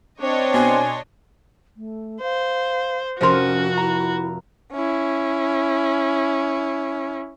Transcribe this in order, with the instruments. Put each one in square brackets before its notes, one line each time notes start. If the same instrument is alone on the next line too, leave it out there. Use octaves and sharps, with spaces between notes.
[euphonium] C4 [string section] D4 C#5 D#5
[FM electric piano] B2 C6 [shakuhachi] G#5
[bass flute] A3
[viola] C5 [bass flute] F5
[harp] F1 A#4 D#7 [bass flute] C#4 [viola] F#4 [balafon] C5 C6
[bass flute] E4 [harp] A#5
[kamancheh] C#4 E4